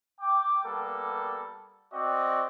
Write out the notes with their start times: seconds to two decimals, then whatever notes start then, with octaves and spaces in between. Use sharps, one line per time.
0.21 G5 D6
0.64 G3 A#3 B3 A4
1.93 C4 F#4 D5 D#5